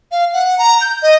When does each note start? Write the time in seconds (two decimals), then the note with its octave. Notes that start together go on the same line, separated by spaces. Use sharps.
0.12 F5
0.33 F#5
0.58 A#5
0.81 G6
1.02 D#5